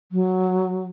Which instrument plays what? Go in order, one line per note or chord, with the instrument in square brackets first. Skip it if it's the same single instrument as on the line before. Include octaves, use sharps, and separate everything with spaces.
[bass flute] F#3